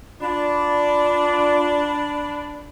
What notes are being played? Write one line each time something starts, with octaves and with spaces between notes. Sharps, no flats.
D4 F4 D5 B5